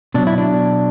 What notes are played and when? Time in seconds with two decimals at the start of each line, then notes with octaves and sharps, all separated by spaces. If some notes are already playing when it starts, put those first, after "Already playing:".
0.14 B2 F#3 D4
0.27 E4
0.38 D4